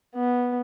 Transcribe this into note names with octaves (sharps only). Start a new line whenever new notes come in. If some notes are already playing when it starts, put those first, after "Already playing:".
B3